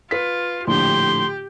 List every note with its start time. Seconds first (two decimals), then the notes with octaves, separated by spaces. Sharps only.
0.11 F4 B4 B6
0.67 A#1 A2 D3 G4 G5 C6